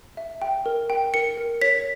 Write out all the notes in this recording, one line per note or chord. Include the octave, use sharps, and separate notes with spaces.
E5
G5
A#4
G5
A#4 C#7
A#4
C#5 B6